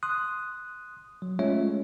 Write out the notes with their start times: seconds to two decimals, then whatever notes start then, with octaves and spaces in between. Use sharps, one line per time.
0.03 C6 D#6 F#6
1.22 F#3
1.39 G#3 A3 C#4 F4 C#5 E5